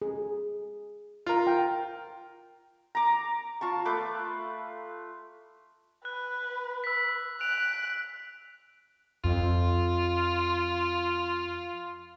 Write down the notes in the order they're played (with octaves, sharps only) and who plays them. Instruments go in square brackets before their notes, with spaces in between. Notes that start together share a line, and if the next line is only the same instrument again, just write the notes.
[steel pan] G#4
[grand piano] F4 A#4
[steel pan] G5
[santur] A#5 D6
F4 A5 C#6
A3 B4 D6
[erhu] B4 [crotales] F#6
[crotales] E6 B6
[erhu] F#6 [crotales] D7 F7
[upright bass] F2 [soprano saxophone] F4